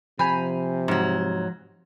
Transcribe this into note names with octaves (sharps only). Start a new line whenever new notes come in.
C3 F3 C5 G#5 A#5 B5
G#2 F#3